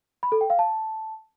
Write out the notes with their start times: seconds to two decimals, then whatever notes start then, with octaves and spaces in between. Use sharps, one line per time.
0.23 B5
0.32 A4
0.41 G5
0.50 F5
0.59 A5